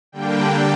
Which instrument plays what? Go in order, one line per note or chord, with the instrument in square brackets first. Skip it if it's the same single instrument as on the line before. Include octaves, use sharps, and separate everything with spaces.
[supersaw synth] D3 G3 A#3 D4 G5